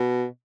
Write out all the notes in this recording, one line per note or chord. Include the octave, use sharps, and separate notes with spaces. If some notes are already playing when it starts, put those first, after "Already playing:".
Already playing: B2